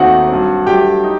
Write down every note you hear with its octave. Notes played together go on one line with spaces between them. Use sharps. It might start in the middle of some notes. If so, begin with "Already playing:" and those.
Already playing: D#2 D#3 A3 C4 D#4 F#4 F#5
G2 F#3 C4
G2 F#3 A3 G4 G5
D#4